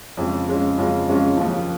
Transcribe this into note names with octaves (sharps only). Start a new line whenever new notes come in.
F2 C#3 G#3 C#4 F4
F2 C#3 G#3 C#4 F4
F2 C#3 G#3 C#4 F4
F2 C#3 G#3 C#4 F4
D#2 C#3 F3